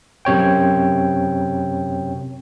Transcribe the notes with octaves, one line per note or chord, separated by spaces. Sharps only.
F#2 C3 C#5 G5